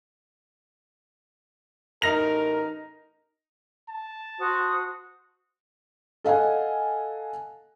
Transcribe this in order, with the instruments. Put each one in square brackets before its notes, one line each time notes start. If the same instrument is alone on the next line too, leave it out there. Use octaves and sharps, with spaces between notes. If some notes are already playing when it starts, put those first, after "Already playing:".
[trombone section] A1 A#4 [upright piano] D#4 A#6 F7
[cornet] A5
[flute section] F#4 C5 D#6
[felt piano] A4 D#5 F5 F#5 G#5